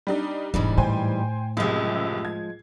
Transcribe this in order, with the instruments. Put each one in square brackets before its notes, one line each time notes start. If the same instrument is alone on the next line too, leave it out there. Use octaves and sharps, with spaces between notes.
[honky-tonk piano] G3 D4 D#4
[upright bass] E1 [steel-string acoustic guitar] G#2 E3 G3 [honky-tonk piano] D4
[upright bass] A2 [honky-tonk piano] C5 G5 G#5
[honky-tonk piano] C#2 F#2 C3 [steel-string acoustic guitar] F3 G#3
[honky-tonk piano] G#6